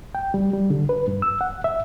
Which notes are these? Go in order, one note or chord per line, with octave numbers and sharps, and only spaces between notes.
G5
G3
G3
D3
B4
G2
E6
F#5
E5